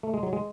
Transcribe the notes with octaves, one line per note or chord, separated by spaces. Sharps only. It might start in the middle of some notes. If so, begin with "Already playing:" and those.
A3
G#3
F#3
G#3